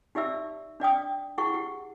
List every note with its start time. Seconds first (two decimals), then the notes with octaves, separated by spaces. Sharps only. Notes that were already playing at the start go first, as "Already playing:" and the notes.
0.15 D#4 G4 D5 E5 E6
0.80 D4 D5 G5 D#6
1.38 E4 G#4 F#5 C#6
1.54 G4